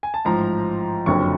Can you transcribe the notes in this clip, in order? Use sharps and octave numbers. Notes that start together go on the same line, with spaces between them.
G#5
A5
A1 G#2 F3 A#5
F#1 F2 D3 F#3 C#6